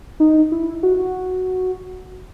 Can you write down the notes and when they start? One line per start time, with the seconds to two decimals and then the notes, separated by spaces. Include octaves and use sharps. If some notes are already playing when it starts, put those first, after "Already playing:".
0.20 D#4
0.52 E4
0.83 F#4